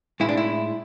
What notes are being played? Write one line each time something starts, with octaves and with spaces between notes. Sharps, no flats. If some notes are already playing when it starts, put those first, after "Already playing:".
A2 G#3 E4
D4
E4